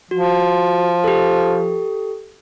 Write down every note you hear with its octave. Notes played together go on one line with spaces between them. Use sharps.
F3 F#4
G4 A4